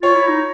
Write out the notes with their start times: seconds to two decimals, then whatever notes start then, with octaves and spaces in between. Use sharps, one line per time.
0.02 F4 C#5
0.15 E4
0.27 D#4